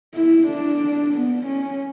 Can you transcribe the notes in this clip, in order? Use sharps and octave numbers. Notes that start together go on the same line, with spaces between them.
E4
D4
B3
C#4